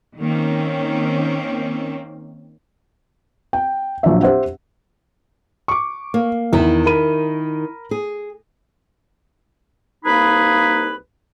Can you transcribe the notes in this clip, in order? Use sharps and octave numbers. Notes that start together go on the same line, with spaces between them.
D#3 A#3 C4 C#4
G5
A#1 F#3 D4 E5
G4 C5 E5 F#5
C#6 D6
A#3
E2 D#3 E4
A#4 B5 D#7
G#4
C2 A#3 D#4 G#4 B4 B5